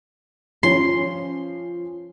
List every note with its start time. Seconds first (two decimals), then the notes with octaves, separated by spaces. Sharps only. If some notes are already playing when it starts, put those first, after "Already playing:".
0.63 F3 C#4 C6